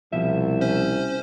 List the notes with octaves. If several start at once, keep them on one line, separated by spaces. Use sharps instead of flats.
C2 B2 F3 E5
C#4 C5